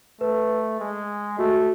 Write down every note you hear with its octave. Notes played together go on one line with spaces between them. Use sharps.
A3 B4
G#3
A3 F#4
F#4